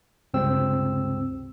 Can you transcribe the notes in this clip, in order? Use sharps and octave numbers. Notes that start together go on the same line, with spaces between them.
C#2 G2 C3 C4 E6